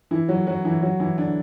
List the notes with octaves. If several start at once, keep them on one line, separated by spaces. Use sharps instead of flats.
E3 E4
F#3 F#4
F#3 F#4
E3 E4
F#3 F#4
E3 E4
D3 D4